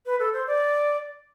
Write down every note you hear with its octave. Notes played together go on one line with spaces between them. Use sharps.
B4
A4
C5
D5